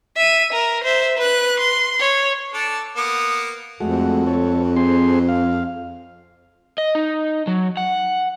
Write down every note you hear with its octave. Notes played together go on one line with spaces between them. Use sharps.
E5 D#7
A#4
C5 E5
B4 F#6
C6
C#5
D4 A4
A#3 B3
F2 G#3 A3 F#4
A4 C#5
C4 G#4 C6
F5
D#5
D#4
F#3
F#5